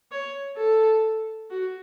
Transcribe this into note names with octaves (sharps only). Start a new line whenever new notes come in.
C#5
A4
F#4